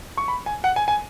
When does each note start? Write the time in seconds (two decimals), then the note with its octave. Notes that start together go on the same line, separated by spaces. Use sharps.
0.17 C#6
0.28 B5
0.46 G#5
0.64 F#5
0.76 G#5
0.88 G#5